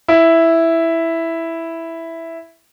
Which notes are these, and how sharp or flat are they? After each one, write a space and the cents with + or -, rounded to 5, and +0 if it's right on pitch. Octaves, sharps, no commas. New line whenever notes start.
E4 +0